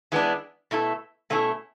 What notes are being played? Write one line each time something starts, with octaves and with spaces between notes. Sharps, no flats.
E3 G#3 B3 D4
B2 A3 E4 A4
B2 A3 C#4 E4 A4